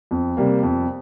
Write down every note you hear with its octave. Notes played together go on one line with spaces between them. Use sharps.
F2
C3 G3 A#3
F2